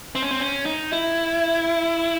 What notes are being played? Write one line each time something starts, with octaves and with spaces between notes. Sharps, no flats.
C4
C#4
C4
C#4
D#4
E4